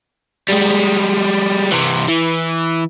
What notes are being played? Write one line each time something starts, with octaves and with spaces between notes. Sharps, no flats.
G3 G#3
C3 E3
E3